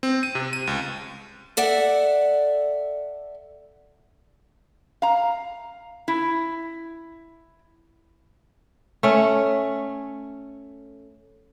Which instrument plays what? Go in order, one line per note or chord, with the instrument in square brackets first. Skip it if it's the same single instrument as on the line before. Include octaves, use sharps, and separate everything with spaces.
[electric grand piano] C4
D#7
C3
D#7
C#2
[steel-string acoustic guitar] A4 D5 E5 F#5
[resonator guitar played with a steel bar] F5 A#5
E4
[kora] A3 C#4